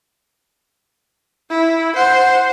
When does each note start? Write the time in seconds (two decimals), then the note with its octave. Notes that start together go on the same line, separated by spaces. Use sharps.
1.50 E4
1.96 C5 F#5